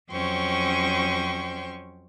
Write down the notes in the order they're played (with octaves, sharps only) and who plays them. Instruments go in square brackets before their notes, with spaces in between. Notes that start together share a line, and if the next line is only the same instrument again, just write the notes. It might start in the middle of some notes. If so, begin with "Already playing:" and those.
[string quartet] F2 F#3 C#4 C5 G5 C#6